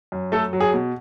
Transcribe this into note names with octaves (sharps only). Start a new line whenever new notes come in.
F#2
A3 A4
F#3
G#4
B2